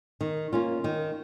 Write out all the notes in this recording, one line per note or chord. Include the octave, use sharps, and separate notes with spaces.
D#3
A#3 C#4 F4
D#3